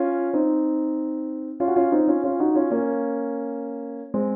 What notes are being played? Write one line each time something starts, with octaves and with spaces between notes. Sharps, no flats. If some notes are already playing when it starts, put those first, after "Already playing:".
Already playing: C#4 F4
C4 D#4
C#4 F4
F#4
C#4 F4
C4 D#4
C#4 F4
C#4 F4
D#4 F#4
C#4 F4
A#3 C#4
G#3 C4